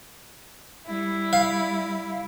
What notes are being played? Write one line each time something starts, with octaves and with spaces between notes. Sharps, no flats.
G3 E4
F5